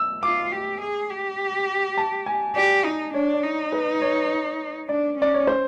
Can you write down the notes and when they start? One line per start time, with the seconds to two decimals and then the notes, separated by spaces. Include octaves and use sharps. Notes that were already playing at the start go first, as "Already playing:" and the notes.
Already playing: E6
0.23 F4 D6
0.52 G4
0.81 G#4
1.10 G4
1.97 A5
2.26 G#5
2.55 G4 D5
2.85 D#4
3.14 D4 C#5
3.34 D5
3.43 D#4
3.72 B4
4.02 C#5
4.89 D4 D5
5.18 C#4 D5
5.34 C#5
5.47 C5